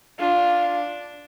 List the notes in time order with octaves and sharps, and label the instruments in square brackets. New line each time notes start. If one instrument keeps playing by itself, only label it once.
[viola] D4 [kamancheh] F4